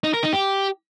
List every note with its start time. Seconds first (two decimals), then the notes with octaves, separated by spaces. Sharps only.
0.04 D#4
0.13 A#4
0.23 D#4
0.33 G4